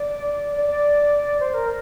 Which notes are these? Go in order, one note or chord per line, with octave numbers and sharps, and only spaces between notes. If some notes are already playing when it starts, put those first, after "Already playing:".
Already playing: D5
D5
C5
A#4